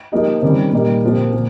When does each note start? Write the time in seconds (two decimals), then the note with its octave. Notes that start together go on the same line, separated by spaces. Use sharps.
0.12 F3 A#3 D#4 G4
0.42 C3 D#3 G3 C#4
0.72 A#2 G3 A#3 D#4
1.04 A#2 F3 C4 G4
1.33 A#2